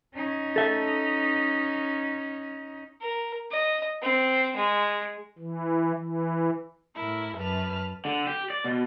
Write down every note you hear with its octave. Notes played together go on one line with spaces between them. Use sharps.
C#4 D#4
A4 E5
A#4
D#5
C4
G#3
E3
E3
A2 E4 A#4
F#2 B4 A5 F6
D3
G4
D5
B2